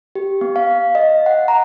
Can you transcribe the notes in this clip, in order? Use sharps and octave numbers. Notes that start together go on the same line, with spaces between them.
G4
B3
F5
D#5
F#5
A#5